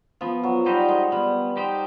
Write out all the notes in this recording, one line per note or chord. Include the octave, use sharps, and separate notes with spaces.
F3 B3
F#3
G3 D#4 G4 C5
G#3
G3 B3
D#4 G4 C5